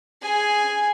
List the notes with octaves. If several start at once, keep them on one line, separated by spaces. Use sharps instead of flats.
G#4 G#5